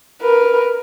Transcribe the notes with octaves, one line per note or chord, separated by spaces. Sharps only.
A#4 B4